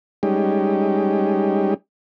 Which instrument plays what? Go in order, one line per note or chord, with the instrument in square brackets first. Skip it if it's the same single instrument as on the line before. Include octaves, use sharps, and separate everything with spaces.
[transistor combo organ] G3 G#3 C#4 D#4 G4